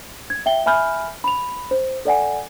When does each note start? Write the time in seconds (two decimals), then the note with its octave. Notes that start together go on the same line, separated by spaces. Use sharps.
0.30 G#6
0.46 E5 G5 G7
0.66 E5 G#5 B5 F6 G6
1.24 B5 F7
1.71 C5
2.05 A4 D5 F#5 G#5